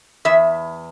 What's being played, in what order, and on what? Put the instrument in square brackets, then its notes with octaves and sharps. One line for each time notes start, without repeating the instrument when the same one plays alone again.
[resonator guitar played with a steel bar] E2 E5